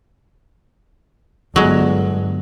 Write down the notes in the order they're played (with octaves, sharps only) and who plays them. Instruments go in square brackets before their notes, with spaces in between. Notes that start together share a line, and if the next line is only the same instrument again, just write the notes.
[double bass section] G1 [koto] F#3 G#3